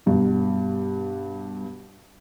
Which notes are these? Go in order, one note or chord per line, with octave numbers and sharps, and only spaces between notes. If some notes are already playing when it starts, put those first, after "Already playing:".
G2 B2